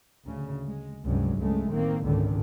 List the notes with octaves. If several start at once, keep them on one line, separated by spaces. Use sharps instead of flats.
D2 C#3
G#3
C#2 G2 C3 F#3 G#3
C#2 C#3 G#3 A3
A1 D#3 A#3 C4
G#1 C#2 A#2 D3 D#3